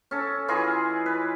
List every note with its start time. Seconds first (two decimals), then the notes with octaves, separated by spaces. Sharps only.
0.11 C#4 A4
0.48 E3 F4 G#4 D#5
1.06 B4